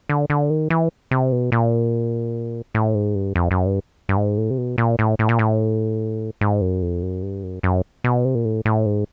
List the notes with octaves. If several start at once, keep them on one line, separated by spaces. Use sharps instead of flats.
D3
D3
D#3
E3
C3
B2
A#2
A2
G#2
G2
F2
F#2
G2
G2
G#2
A2
C3
B2
A#2
A2
A2
A#2
A2
G#2
F#2
F2
F#2
G2
F#2
F#2
B2
C3
A#2
A2
A2
G#2